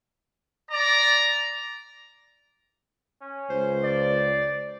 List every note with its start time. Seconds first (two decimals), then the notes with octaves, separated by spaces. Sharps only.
0.70 D5 A#5
3.21 C#4
3.50 C#2 C5
3.84 D5